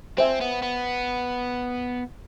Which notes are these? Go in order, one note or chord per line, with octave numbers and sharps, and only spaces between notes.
C4 C5 E5 G#5
B3
B3